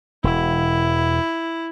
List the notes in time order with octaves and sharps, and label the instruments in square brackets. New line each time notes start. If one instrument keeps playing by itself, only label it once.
[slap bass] E1 [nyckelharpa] E4